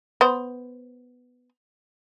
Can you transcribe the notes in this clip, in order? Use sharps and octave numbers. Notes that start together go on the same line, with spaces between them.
B3 C5